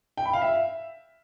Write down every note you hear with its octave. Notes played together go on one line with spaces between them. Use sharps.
G5
B5
F5
E5